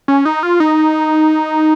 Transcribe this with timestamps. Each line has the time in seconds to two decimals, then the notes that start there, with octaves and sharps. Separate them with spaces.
0.08 C#4
0.25 D#4
0.43 F4
0.60 D#4